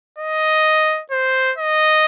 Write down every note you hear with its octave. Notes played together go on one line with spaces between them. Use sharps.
D#5
C5
D#5